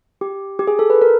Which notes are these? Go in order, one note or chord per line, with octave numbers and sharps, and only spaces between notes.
G4
G4
G#4
A4
B4
A#4